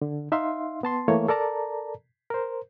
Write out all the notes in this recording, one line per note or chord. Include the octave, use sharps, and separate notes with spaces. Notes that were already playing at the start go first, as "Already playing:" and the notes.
D3
D#4 E5 F5 C6
B3 A5 C6
E3 A3 A#3 C#5
A4 A#4 D5 A5 A#5
A#4 C5